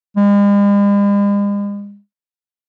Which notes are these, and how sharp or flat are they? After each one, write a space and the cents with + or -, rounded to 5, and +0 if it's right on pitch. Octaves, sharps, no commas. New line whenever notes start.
G#3 -45